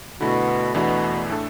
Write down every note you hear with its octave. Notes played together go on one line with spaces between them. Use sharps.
B2 D3 A3 E4
E2 B2 E3 A3 D4
A2 A3 D4 A4